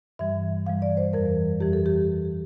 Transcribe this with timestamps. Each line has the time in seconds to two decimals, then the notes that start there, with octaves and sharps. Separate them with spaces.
0.19 G2 E3 G3 E5
0.66 G2 E3 G3 F5
0.82 D5
0.97 C5
1.13 F2 E3 G3 A#4
1.60 F2 E3 G3 G4
1.73 A4
1.86 G4